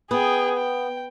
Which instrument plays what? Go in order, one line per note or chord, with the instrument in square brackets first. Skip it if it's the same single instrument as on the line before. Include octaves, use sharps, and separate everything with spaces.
[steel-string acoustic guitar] B3 [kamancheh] G#4 G5
[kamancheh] G5